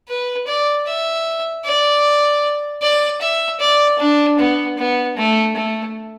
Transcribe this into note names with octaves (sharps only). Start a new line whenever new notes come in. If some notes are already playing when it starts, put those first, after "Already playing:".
B4
D5
E5
D5
D5
E5
D5
D4
B3
B3
A3
A3